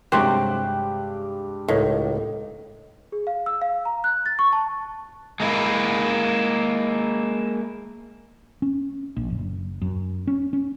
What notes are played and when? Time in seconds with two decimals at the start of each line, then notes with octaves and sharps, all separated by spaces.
0.12 G2 C3 F#3 G#3 G4 C5 F#6
1.68 C#2 A2 D#4 A#4
3.12 G#4
3.27 F5
3.46 E6
3.62 F5
3.85 A#5
4.04 F#6
4.26 A6
4.39 C#6
4.53 A5
5.40 G#3 A#3 E4
8.62 C#4
9.17 A#1
9.30 F#1
9.82 F#2
10.27 C#4
10.53 C#4